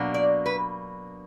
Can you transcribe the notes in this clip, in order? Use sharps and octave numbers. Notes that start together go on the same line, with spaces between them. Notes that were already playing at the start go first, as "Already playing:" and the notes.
Already playing: B2 F#3 A#3 D4
D5
B4